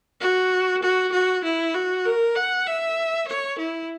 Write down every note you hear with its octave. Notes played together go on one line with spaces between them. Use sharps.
F#4
F#4
F#4
E4
F#4
A#4
F#5
E5
C#5
E4